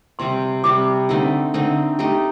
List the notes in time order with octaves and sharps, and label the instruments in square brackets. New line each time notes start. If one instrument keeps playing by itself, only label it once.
[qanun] C3 G3 C4 [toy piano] C6
[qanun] C3 G3 C4 [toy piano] D6
[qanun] D3 A3 C4 D#4
D3 A3 C4 D#4
A3 D#4 G4